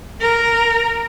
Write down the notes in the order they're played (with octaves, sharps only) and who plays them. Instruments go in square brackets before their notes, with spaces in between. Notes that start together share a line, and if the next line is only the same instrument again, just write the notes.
[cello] A#4